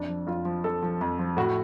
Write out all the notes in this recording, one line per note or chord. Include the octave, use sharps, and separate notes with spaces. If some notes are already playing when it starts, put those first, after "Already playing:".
Already playing: F2 D4
F3
F2 F4
F3
F2 A4
F3
F2
F3
A2 F#4